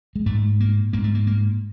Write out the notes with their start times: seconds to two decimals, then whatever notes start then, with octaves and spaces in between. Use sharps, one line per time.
0.16 G#3
0.26 G#2 A3
0.60 A#3
0.93 G#2 A#3
1.04 A3
1.14 A#3
1.27 A#3